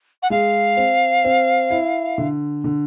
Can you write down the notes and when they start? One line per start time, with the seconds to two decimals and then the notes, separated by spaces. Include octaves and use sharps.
0.23 F#5
0.30 G#3 F5
0.77 C4
1.25 C4
1.70 E4
2.18 D3
2.64 D3